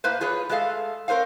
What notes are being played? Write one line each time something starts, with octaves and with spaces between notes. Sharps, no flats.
A2 A#3 B4 C5
F4 G#4 B4 C#5
G#3 A3 G#4 A4 F5
C4 A#4 C5 C#5 F5